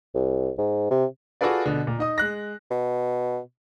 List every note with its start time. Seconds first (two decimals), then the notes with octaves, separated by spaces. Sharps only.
0.15 C2
0.58 G#2
0.90 C3
1.41 F4 F#4 G#4 A4 B4 D5
1.66 B2 D3
1.87 A#2
1.99 D#4 D#5 D#6
2.18 G#3 F#6 A#6
2.71 B2